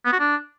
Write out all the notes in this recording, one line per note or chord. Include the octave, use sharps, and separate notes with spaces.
B3
F#4
D4